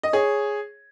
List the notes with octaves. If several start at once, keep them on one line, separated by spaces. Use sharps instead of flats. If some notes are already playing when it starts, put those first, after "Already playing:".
D#5
G#4 C#5